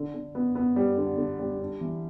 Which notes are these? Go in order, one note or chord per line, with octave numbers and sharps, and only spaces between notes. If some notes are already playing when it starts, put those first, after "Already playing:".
Already playing: D3
D3
B3
B3
G3
D3
D3
G3
D4
E3